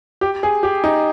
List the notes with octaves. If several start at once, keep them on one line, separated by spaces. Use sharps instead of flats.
G4
G#4
G4
D#4